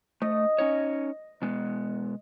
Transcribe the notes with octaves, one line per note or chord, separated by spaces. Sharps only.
A3 D#5
C#4 D#4 C#5
B2 G#3 B3